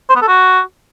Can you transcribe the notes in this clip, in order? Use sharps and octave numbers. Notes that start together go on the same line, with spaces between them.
C5
B3
A4
F#4